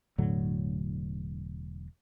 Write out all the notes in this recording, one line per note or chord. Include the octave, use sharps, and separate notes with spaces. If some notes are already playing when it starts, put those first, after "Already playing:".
E1 A2 D3 F#3